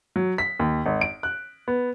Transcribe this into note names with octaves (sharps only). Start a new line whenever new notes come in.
F#3
B6
D#2
G#1
D7
F#6
B3